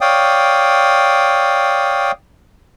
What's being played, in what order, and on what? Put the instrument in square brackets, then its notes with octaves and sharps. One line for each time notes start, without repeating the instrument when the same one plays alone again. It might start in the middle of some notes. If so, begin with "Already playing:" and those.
[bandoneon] C#5 D5 F5 G5 D#6